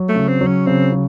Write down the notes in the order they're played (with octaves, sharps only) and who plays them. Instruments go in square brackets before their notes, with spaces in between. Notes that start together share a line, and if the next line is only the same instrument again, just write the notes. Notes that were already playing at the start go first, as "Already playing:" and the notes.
Already playing: [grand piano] F#3
[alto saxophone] A3
[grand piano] C#3
[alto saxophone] C4
[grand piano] F#3
[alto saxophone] C#4
[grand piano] C#3 [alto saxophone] C4
[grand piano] C#3